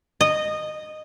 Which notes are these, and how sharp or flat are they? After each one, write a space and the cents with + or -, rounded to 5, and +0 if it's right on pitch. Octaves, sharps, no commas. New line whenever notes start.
D#5 -15